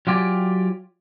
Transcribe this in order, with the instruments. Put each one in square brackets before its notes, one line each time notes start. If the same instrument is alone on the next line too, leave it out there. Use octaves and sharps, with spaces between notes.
[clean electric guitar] F#3 F4 G4 D5 G#5